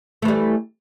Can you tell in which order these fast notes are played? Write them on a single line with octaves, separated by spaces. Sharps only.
A3 E3 G3